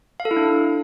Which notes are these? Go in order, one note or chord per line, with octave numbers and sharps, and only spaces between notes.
F5
A4
E4
D4